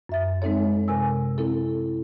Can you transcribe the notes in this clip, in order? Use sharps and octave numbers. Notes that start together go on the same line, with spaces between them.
F#2 E5 A6
G#3 C4 D#4 A4 C#5
C3 A#4 G#5 E6
C4 E4 A4